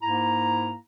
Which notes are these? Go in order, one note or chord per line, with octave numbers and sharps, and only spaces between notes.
G#2 A#3 E4 A#5